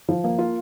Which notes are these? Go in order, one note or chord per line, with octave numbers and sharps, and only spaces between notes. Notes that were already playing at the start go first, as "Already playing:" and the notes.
F3
A#3
F4